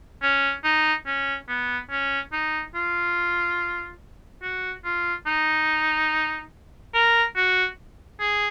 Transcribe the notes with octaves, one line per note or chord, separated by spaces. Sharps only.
C#4
D#4
C#4
B3
C#4
D#4
F4
F#4
F4
D#4
A#4
F#4
G#4